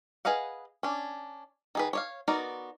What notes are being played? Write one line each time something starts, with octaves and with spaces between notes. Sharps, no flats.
G#4 B4 D#5 F5 F#5
C#4 D4
D#3 G#4 B4
C#5 D5 F5
B3 D#4 F#4 A#4 D5